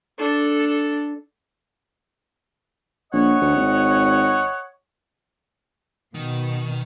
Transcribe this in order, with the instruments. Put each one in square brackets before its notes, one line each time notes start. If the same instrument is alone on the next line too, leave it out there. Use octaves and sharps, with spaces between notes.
[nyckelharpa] D4 A4
[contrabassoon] A#1 [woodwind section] C#5 D#5 F#5
[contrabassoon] D2
G#1
[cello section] B2 [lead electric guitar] D#3